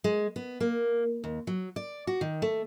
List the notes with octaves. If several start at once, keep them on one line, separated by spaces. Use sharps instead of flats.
G#3
B3
A#3
D#2
F#3
D5
F#4
D#3
A3